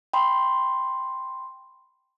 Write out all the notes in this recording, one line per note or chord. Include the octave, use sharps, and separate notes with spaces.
G5 B5 C6